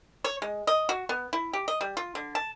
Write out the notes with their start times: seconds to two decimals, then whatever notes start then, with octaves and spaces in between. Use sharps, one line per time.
0.24 C#5
0.42 G#3
0.67 D#5
0.89 F#4
1.09 B3
1.33 E4
1.53 G4
1.68 D#5
1.81 G3
1.97 F4
2.15 D3
2.35 A5